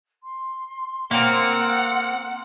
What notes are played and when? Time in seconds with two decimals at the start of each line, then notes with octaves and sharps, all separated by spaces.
0.23 C6
1.11 A#3 C4 F#5